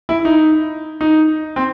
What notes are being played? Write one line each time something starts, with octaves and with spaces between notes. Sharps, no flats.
E4
D#4
D#4
C4